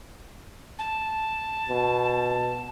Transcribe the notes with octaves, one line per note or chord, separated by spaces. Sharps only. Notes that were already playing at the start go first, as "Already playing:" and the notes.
A5
B2